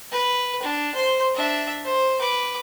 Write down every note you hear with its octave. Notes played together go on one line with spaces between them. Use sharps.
B4
D4
C5 C6
D4 E5
C5
B4 D6